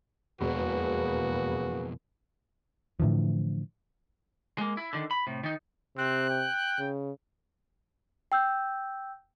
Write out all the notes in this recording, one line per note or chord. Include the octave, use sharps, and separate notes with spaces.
E1 F2 B2 E3 A#3 F#4 G#4 B4
A2 D3 E3 F3
G#3 A#3
E4
D3 D#3
B5
A2 C3
D#3 D#4
C3 C4 F#6
G5
C#3
G5 E6 G6